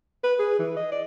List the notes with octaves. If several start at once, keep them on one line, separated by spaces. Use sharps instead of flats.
B4
G#4
E3
D#5
D5